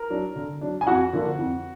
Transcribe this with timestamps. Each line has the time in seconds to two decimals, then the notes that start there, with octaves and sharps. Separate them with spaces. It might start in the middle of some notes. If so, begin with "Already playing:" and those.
Already playing: A#4
0.10 F#3 D4
0.36 D3
0.61 F#3 D4
0.81 G#5
0.87 F2 F#4 F#5
1.13 D3 F3 A#3 D4
1.38 F2